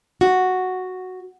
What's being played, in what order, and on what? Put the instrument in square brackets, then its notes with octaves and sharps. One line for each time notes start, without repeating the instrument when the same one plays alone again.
[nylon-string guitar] F#4